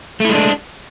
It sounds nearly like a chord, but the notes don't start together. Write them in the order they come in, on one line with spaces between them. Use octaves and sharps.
A3 E4 G#3 D4